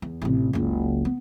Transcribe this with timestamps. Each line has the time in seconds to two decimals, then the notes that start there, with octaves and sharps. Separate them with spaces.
0.02 E2
0.22 A1 C3
0.53 F#1 C#2
1.05 B3